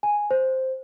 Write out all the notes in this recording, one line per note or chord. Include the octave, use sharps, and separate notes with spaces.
G#5
C5